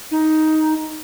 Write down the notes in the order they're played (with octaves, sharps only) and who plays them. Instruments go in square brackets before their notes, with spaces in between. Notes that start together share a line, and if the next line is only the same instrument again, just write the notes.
[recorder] D#4